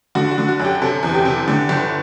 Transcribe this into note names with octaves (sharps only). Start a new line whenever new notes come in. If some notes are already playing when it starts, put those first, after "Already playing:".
D3 F#4
F#4
D3
F#4
F#2
G4
C3 A4
E2
G4
C3
D3
G1